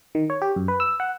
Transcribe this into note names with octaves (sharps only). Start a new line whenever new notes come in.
D#3
C#5
G4
F#2
B4
E6
F#5